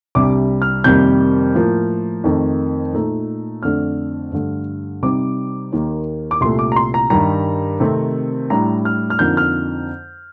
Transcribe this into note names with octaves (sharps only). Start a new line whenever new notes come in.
C2 C3 G3 D4 D6
F6
F2 C3 D#3 G3 A#3 G6
A2 F3 A#3
F2 D#3 A3
A#2 A3 D#4
F2 D3 A3 D4 F6
G2 D3 A3
C3 G3 C4 D#4 D6
D#2 D#3 A#3
D6
C2 A#2 A3 C6
D6
A#5
C6
A#5
G2 D#3 G3 A#5
C3 D#3 A3 C4
A2 G3 D4 A#5
F6
F6
F2 D3 F3 A#3 D#4 G6
F6